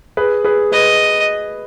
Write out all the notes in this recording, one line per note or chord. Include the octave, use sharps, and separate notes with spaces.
G#4 B4
G#4 B4
G#4 B4 D#5